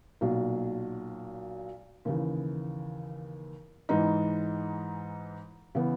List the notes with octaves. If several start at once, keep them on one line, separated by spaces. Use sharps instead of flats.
B1 A#2 F#3
D#2 C#3 E3
G#2 E3 G#3 D#4
C#3 E3 B3